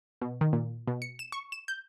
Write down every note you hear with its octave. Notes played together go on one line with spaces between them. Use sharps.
B2
D#3
A#2
B2
C#7
E7
C#6
E7
G6